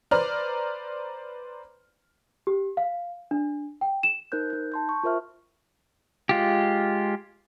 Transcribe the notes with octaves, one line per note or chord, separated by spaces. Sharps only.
B4 C5 D5 A#5 F6
G4
F5
D4
G5
E7
D#4 A#4 C5 F#6 G6
D#4 G6
A5 C6 G6
C#6
F4 A#4 C5 E5 F6
G#3 F4 G4